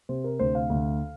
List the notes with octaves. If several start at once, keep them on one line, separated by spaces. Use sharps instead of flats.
C3 C5
A#4
D2 C5
F5
D2